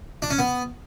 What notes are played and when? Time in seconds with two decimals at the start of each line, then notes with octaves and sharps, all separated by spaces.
0.22 D4
0.30 C#4
0.39 B3